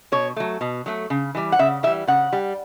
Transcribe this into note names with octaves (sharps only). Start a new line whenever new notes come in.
B2 C#5
F#3 A3
B2
F#3 A3
C#3
E3 G3
F#5
C#3 E5
E3 G3 E5
C#3 F#5
G3